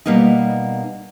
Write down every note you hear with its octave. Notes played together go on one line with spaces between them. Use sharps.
B2 G3 A#3 B3 D#4